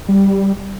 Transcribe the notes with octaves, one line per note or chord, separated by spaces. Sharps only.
G3